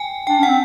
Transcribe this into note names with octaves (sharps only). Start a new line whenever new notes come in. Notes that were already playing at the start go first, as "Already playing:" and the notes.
Already playing: G5 G#5
D4 G5
C#4 F#5
C4